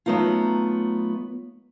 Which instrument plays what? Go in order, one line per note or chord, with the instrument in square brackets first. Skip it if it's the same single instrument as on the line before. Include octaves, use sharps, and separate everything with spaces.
[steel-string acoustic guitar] F#3 A3 B3 D#4 F4